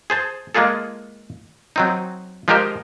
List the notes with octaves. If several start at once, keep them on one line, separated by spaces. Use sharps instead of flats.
G#4 C5 A5
G#3 A#3 F4 G#4 A4
F#3 C4 D#4
F3 G#3 D#4 G4 A#4 C5